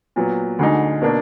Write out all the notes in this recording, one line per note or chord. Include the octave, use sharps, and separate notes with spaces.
A#2 F#3 B3
D2 D3 G#3 D#4
B2 A#3 D4